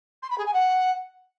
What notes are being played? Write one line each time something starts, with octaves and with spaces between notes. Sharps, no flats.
C6
B5
G#4
G#5
F#5